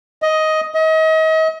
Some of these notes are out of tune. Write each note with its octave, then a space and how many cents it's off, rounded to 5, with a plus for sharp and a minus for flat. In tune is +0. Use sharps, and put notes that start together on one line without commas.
D#5 +10
D#5 +35